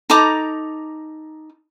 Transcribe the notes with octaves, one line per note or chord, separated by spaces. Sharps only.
D#4 A4 A#5 D6